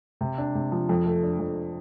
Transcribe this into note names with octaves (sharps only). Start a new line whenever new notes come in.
C3
D4
C3
F3
F2
A3
D4
F2